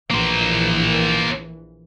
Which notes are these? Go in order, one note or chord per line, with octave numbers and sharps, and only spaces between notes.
A#1 E3 A#3 C5